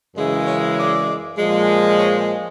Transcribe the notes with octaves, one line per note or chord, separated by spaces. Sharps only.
F#2 C#3 E3 G#3
C#5
D5
A#2 F3 G#3
C#5